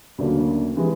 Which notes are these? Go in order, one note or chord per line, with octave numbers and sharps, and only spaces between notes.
D2 C#3 F#3 A#3 D4
C3 E3 G#3